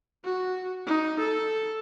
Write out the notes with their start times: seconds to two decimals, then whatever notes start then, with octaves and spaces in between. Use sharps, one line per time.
0.25 F#4
0.87 D#4
1.19 A4